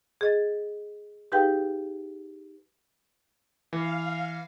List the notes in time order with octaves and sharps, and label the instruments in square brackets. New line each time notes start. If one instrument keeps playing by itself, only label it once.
[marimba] G#4 D#5 A6
D#4 G4 G#4 B4 F5 G5
[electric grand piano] E3 [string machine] F5